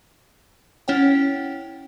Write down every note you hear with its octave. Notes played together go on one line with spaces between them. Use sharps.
C#4 E4 C#5 F#5 G5